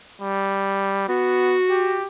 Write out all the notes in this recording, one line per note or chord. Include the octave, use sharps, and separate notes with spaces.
G3
B3 F#4
G4